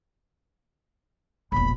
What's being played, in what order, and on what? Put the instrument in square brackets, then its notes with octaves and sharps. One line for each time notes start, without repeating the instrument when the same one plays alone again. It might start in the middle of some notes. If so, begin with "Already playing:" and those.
[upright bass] E1 A#1 [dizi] B5